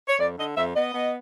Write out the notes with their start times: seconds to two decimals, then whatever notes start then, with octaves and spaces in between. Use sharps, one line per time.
0.09 C#5
0.20 F2 D5
0.38 D3 D#5
0.57 F2 E5
0.77 B3 D#5
0.94 B3